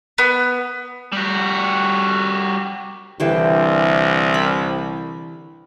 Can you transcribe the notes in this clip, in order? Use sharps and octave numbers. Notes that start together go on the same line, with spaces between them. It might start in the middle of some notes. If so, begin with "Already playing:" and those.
B3
G3 F#4
C2 D3 E3 G4
B5